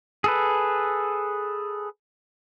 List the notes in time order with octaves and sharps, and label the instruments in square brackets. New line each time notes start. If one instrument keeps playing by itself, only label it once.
[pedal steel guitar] G#4 A4 B4